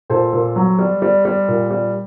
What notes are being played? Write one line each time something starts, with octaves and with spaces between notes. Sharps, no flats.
A#2 A4 C5
A#2
F#3
G3
G3
G3
A#2
G3